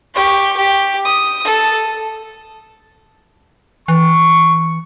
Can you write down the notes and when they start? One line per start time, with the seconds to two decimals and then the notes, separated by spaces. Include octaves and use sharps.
0.14 G4 C#6
0.57 G4
1.05 D#6
1.44 A4
3.88 E3 C#6